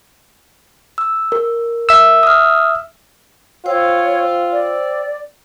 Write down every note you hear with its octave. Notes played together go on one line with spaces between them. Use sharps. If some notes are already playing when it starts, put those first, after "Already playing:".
E6
A#4
E5 E6
D#6 F6
F4 C5 C#5 G5 E6
D5